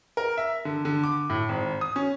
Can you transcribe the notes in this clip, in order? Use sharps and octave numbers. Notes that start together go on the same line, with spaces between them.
A#4
E5
D3
D3
D6
A2
G#1
D#6
C#4